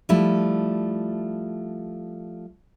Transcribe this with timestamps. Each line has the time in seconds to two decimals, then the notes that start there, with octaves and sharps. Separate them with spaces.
0.09 F3 G3 A3 E4